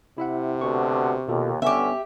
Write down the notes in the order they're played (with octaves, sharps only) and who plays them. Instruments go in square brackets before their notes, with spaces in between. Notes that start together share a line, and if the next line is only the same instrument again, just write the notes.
[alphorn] C3 [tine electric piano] E4 E5 F#5
[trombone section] D2 B2 D3 [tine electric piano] C#6
[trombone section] D#2 [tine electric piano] B2 F4 A4
[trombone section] G2 D3 C#4 [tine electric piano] B3 [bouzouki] G4 E5